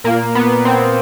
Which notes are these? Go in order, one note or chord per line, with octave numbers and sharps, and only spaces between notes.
A#2 A#3
B3
C4